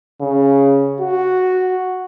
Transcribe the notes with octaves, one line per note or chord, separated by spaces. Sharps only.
C#3
F#4